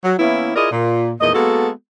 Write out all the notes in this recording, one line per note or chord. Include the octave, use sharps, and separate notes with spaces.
F#3
E3 A#3 B3 C#4 E4
E4 F4 G#4 A#4 D5 D#5
A#2
E2 A#2 D#3 A3 D#5
G#3 A#3 B3 F#4 A4